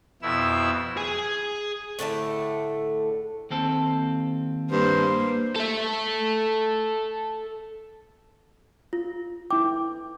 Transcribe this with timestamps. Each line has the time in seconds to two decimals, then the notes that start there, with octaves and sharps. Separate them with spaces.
0.22 F2 B2 E4 E6
0.97 G#4 G#5
1.99 A2 D3 A3 A5
3.50 D#2 C4 A4
4.71 G2 A#3 C5
5.56 A4 E5
8.93 F4
9.51 E4 G5 D6